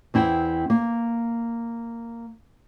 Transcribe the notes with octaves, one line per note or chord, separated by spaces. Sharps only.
E2 C4 E4 G5
A#3